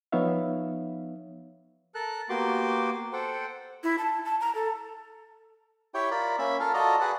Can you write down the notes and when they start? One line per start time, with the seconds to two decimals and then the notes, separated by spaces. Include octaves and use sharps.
0.12 F3 B3 D#4 C#5 E5 F5
1.95 A4 A#4 A5 F#6
2.29 A#3 B3 F#4 G4 C6 D6
3.13 A4 C5 F#5 G5
3.84 E4
3.98 A5
4.25 A5
4.40 A#5
4.55 A4
5.94 E4 G4 C#5 G5
6.11 F4 A#4 D5 B5
6.39 A#3 C#4 E5 B5
6.60 F4 A4 A#4 F5
6.74 F4 F#4 A4 D5 D#5 A#5
7.01 F#4 G#4 B4 D5 F#5